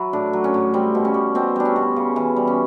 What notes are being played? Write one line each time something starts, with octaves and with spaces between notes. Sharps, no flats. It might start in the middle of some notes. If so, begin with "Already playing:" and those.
Already playing: F#3 E4
A2 D4
F#3
C#4
A2
G3 C4
B2
C#4
G3
B2 C4
G3 D4
C#4
B2
C#3
E3
G3
C#4